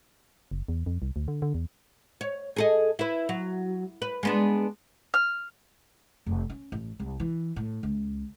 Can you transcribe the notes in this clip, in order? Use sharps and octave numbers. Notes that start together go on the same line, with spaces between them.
F#1
E2
F2
C2
D2
D3
D3
E2
C#5
G#4 A4 D#5
E4 B4
F#3
B4
G#3 B3 D4
F6
F1
C#4
A1
C2
E3
A2
C#2